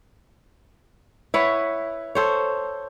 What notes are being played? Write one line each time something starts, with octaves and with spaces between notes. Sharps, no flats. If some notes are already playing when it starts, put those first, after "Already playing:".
E4 B4 C#5 F#5
A4 C5 C#5